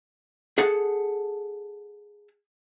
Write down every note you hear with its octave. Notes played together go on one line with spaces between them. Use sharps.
G#4 A4 F#5 A5